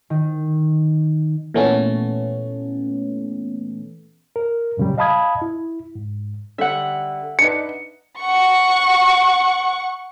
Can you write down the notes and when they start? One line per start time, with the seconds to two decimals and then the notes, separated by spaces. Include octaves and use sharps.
0.10 D#3
1.54 A#2 E3 A3 B3 C#4
4.36 A#4
4.77 F#2 A#2 C#3 F#3 G3
4.98 D#5 F5 A5 B5 D#6 G#6
5.42 E4
5.95 G#2
6.58 D3 G3 E5 F#5
7.39 D4 D#4 B4 C#7
8.20 F#5 C#6